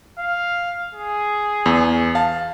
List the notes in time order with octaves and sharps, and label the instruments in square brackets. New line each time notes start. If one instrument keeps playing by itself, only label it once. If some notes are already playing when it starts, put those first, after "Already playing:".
[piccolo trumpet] F5
G#4
[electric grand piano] E2
F5 A5